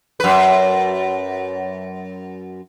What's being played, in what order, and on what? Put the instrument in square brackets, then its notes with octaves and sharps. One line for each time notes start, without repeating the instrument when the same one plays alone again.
[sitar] F#2 B4